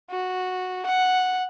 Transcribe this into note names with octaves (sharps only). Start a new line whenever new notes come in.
F#4
F#5